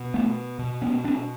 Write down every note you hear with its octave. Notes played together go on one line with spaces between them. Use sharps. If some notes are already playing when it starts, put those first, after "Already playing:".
Already playing: B2
A3 B3
B2
B3 C#4
C4 D4